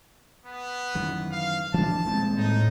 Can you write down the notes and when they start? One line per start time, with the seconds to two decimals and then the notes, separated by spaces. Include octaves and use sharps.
0.46 B3
0.95 F#2 D#3 E3
1.31 F5
1.74 E3 F3 D4 A5
2.05 D#1 G#3 C4
2.37 A2 D#4